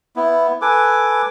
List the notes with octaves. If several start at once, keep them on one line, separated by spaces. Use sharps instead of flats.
B3 E4
A4 B4 G#5 D6